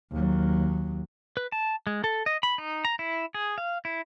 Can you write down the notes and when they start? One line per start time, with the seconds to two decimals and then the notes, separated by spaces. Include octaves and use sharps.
0.12 D#2 F#3
1.37 B4
1.52 A5
1.87 G#3
2.04 A4
2.26 D#5
2.43 B5
2.58 D#4
2.85 A#5
2.99 E4
3.34 G#4
3.58 F5
3.85 E4